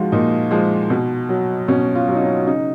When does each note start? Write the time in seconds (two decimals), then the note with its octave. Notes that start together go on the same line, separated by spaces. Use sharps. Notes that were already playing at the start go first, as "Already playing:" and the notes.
Already playing: F3 G#3 D#4 F4 F#4
0.12 A#2 D#4
0.51 F3 G#3
0.90 B2
1.29 F#3
1.68 B2 C#4
1.95 F4
2.08 F#3
2.16 D#4
2.21 C#4
2.47 C#3 D#4